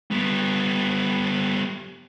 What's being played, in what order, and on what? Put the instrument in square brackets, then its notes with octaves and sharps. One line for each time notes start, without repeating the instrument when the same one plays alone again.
[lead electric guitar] G3 B3